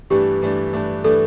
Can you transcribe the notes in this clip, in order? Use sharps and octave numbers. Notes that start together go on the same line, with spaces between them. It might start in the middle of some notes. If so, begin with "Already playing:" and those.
G2 E3 A3 D4 G4
G2 E3 A3 D4
G2 E3 A3 D4
E3 A3 D4 A4